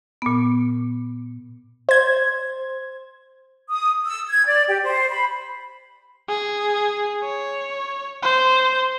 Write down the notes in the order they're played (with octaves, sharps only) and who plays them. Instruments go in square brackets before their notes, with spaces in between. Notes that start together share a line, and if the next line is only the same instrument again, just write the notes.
[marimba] A#2 B3
[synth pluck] C5 G#6
[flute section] D#6
E6
G#6
D5
G4
C5
B5
[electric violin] G#4
C#5
C5